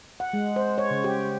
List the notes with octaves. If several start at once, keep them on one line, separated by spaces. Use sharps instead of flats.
F#5
G#3
C5
C#5
C#3
G4